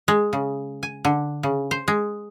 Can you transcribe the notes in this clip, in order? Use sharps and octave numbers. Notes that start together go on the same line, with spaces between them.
G#3
C#3
G#5
D3
C#3
C5
G#3